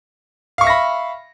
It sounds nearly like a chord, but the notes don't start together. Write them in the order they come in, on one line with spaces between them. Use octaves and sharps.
F5 C#6 E5 A#6 B5